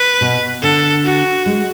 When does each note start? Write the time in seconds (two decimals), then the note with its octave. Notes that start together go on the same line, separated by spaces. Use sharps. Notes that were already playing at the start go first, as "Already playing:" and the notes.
Already playing: B4
0.21 B2
0.62 D3 A4
1.04 F#4
1.46 G#3